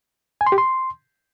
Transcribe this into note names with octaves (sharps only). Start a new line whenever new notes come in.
G#5
C6
G4
C6